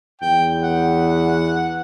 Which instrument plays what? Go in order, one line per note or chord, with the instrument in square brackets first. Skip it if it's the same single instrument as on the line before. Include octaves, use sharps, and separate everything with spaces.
[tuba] E2 [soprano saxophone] G5
[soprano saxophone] F#5